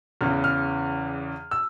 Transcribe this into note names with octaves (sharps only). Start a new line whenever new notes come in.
E2 C#3 E3 F6
F6
E6